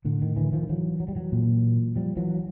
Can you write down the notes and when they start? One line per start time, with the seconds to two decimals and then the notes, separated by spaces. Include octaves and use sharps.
0.05 A2 D3
0.22 D#3
0.36 D3 E3
0.53 D#3 F3
0.69 E3 F#3
1.00 F#3
1.08 G3
1.15 E3 F#3
1.32 A#2
1.96 F3 G3
2.17 E3 F#3